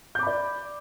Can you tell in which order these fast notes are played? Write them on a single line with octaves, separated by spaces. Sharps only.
G6 D6 B5 D5